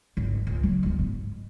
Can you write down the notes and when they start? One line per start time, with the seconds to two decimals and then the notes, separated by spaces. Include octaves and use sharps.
0.17 G#1
0.47 C#2
0.63 F#3
0.83 G1 D2
0.99 G#2